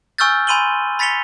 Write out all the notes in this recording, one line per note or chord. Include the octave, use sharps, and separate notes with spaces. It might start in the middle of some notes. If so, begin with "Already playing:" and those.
G#5 C#6 E6 F6 G6 A6
G#5 B5 C6 D#7 F#7 G7
B5 A6 B6 C#7 F7 G7